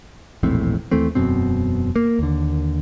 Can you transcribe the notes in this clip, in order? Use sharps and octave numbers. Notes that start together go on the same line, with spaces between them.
E1 A#1 A2 C4
D#2 E3 A3 C4
E1 F#2 B2 C4
A#3
D#2 D3